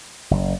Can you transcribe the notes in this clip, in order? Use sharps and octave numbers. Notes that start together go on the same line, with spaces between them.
F#1